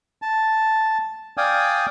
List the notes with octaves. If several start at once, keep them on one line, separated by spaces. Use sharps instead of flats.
A5
D5 F5 G5 G#5 D#6